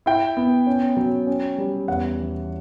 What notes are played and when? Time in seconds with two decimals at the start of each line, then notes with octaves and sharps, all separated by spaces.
0.06 E4 G5
0.37 B3
0.67 C#4
0.97 F#3
1.27 C#4
1.58 G3
1.88 E2 F#5
2.18 E3